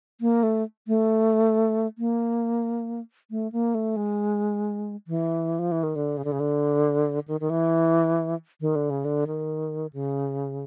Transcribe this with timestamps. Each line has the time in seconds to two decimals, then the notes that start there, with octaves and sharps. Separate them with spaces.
0.21 A#3
0.43 A3
0.87 A3
1.98 A#3
3.31 A3
3.52 A#3
3.75 A3
3.96 G#3
5.07 E3
5.59 F3
5.72 E3
5.83 D#3
5.96 D3
6.17 C#3
6.25 D3
6.32 C#3
6.40 D3
7.28 D#3
7.40 D#3
7.50 E3
8.61 D#3
8.75 D3
8.90 C#3
9.05 D3
9.27 D#3
9.93 C#3